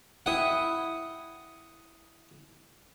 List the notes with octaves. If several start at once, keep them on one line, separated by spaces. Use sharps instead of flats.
E4 F#5 G5 D#6